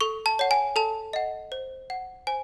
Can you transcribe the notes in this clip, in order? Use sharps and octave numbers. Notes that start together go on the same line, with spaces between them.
A4 C#6
A5
C#5 F#5
G#5
A4 A5
D#5 F#5
C5
F#5
C5 G#5